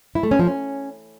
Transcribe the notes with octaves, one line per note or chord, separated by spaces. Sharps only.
E4
A3
C#4
F3
C#4